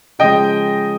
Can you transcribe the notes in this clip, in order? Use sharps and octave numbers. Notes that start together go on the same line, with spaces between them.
C#3 F3 G#3 D#5 G5